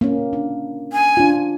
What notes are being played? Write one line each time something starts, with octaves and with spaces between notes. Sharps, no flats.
A#3 C#4
D4
G#5
D4 F4